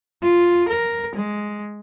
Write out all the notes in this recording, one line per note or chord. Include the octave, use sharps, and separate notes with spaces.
F4
A#4
G#3